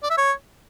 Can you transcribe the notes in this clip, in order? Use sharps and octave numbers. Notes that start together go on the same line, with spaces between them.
D5
E5
C#5